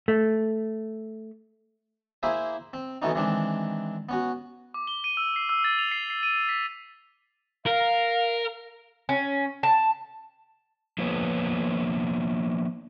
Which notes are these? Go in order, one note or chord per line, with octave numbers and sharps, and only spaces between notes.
A3
A#3 E4 G#4 C5 E5 G#5
C4
B2 E3 A3 B3 C#4 D#4
D#3 E3 G#3 C4 D4
B3 C#4 F#4
D6
G7
D#7
E6
C7
E6
A6
F7
C7
C7
D#7
B6
A#4 F5
C#4
A5
F3 A#3 B3 B4 C#5